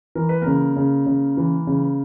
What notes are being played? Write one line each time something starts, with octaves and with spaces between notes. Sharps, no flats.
E3 A#4
B4
C#3 A#3 A#4
C#3
C#3
E3
C#3